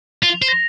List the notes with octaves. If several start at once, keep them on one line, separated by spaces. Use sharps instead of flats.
F4 F7
C5
A#6